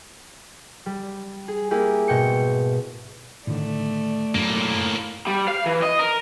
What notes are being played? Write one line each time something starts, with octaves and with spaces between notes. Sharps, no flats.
G3
G#4
A#3 E4 G4 G#4
G#2 B2 G5 C#7
A2 D3 D#3 A3 D5
F#2 A2 A#3
G3
F5
E3
D#5
A#4